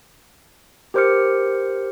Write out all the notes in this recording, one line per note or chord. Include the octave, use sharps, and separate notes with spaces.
G4 A#4 C5 D6 F6 C#7